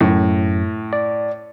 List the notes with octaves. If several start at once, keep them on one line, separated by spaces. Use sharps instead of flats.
F#2 A2
D5